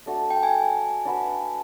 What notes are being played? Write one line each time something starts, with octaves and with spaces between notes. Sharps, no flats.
A3 D4 F#4 A4
G5
G#5
D4 F#4 B4 E5